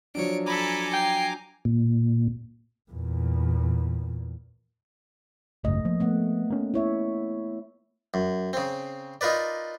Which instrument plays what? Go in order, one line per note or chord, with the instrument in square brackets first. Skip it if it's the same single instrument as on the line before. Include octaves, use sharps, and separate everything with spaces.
[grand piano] F3 F#3 D4 [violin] C#5 D7
[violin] A4 B5 [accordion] G#5 A#5 D6
[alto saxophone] G5 [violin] C7
[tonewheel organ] A#2
[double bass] E2 A#2
[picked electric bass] G#1 C#2 F#2 [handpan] A3 D#5
[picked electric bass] F3 [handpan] A#3
[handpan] A3 B3 F#5
[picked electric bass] A#3 C#4
[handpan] E4 C#5 E5
[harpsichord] F#2
C#3 C4
D#4 F4 A#4 B4 D5